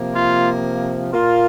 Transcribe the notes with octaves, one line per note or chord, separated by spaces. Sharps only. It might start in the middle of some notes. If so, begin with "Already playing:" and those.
Already playing: C3 F3 A#3
F4
A#2 A#3 F4